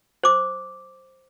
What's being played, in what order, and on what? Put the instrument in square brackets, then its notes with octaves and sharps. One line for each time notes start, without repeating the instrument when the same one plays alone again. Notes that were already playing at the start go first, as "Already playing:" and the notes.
[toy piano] C5 D6